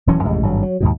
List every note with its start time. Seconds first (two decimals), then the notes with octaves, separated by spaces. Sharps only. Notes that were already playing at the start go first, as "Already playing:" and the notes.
0.07 D#1 E3 F#3 C#4
0.23 A1 F2 C3 G#3
0.43 G#1 G2 F#3
0.63 F#3
0.80 D#2 G#2 B2